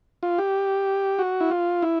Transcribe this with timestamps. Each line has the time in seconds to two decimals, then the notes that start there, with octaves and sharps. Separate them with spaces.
0.23 F4
0.38 G4
1.19 F#4
1.41 E4
1.51 F4
1.82 E4